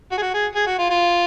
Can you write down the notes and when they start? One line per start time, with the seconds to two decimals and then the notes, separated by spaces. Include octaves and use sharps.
0.12 F#4
0.17 G#4
0.22 F#4
0.34 G#4
0.55 G#4
0.67 F#4
0.79 F4
0.90 F4